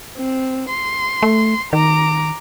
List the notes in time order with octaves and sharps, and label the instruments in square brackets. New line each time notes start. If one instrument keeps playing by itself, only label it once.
[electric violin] C4
C6
[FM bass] A3
[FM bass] D#3 [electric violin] A#5 D6